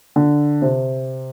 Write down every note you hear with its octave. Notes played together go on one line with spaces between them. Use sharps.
D3
C3